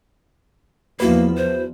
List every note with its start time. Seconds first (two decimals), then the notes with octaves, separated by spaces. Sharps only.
1.00 E2 F3 A#3 E4 F#4 B4
1.37 C5